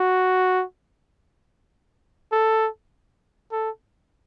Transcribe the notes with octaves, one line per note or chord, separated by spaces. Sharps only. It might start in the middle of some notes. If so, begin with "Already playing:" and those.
Already playing: F#4
A4
A4